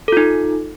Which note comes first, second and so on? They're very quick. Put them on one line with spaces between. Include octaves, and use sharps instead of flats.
A4 F4 D#4